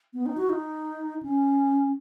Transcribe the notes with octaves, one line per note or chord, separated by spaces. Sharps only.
B3
D#4
F#4
D#4
C#4